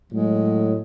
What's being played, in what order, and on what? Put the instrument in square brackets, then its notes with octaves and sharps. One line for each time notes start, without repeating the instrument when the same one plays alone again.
[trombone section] A2 F#3 [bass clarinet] G#3